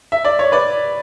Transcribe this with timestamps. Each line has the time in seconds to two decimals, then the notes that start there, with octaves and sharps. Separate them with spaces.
0.12 E5
0.25 D5
0.39 C#5
0.52 B4 D5